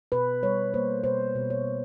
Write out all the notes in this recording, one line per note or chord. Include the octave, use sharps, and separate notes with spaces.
B2 B4
G3 C#5
A#3 C5
B2 C5
B2
C#5
G3